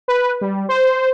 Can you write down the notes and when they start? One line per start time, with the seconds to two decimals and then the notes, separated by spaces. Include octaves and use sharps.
0.08 B4
0.41 G3
0.69 C5